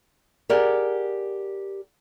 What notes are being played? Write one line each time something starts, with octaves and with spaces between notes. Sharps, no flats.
G4 G#4 A#4 D5 F#5